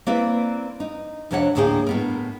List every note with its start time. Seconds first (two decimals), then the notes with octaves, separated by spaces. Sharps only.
0.07 A#3 C4 E4 B4 D5
0.80 D#4
1.31 F2 C3 D4 C#5 E5 F#5
1.55 D2 A2 A#3 G#4 E5 G5
1.87 A2 B3 A#4